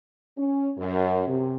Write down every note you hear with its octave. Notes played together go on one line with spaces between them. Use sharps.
C#4
F#2
C3